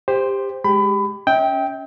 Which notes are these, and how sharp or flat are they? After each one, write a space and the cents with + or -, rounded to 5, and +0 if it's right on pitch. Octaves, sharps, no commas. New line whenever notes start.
G4 +20 C5 +0
G#3 +0 G4 +0 B5 +25
C#4 +20 E5 -40 G5 +0